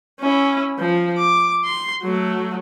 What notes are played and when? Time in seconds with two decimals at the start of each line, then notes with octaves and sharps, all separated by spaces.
0.21 C#4 E4
0.79 F3
1.17 D6
1.65 C6
2.03 F#3 A3